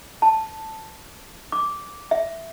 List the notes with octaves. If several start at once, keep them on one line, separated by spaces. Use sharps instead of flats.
A5
D6
E5